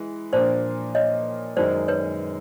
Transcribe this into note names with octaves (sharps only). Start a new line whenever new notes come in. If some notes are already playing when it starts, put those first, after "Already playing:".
Already playing: E3 G#3
A#2 F3 A#3 D4 C5 D5
C#5 D#5
F#2 D#3 G#3 C5 D5
B4 C#5